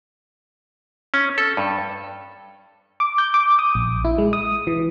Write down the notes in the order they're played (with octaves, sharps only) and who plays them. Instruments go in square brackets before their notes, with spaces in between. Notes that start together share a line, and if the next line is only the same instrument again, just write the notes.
[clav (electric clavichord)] C#4
A4
G2
[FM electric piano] D6
G6
D6
D#6
A#1
E4
G#3
D#6
E3